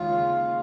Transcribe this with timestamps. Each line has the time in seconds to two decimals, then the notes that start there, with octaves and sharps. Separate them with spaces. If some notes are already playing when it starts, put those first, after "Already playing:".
Already playing: D#2 C#3 G#3 C#4 F4